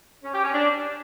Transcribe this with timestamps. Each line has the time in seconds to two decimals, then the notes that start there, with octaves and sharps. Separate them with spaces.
0.24 C#4
0.34 G4
0.44 C#4
0.54 D4